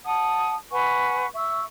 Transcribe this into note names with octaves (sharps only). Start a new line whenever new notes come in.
F#5 A5 D#6
B4 F#5 G#5 C#6
E5 C#6 E6